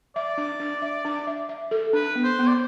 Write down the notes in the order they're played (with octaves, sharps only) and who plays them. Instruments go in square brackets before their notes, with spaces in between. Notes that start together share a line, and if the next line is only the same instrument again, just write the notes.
[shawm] D5 [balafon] E5
[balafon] D4
D4
E5
D4
E5
E5
A4
[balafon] D4 [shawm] B4
[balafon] B3
[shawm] C5
[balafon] B3
[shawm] D5